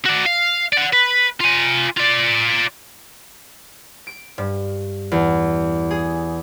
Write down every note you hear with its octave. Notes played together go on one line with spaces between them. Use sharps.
F#4 D5
F5
D5 F#5
B4
F4 G#5
F4 D5
D7
G2
E2
G#4